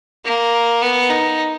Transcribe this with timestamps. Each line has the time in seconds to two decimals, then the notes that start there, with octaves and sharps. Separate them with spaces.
0.25 A#3
0.82 B3
1.10 D#4